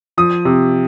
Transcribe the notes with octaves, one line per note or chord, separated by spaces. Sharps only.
F3 D#6
C3